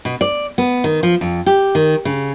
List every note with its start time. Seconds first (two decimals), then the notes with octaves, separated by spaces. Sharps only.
0.05 B2
0.21 D5
0.58 B3
0.84 D#3
1.03 F3
1.21 F2
1.46 G4
1.75 D#3
2.05 C#3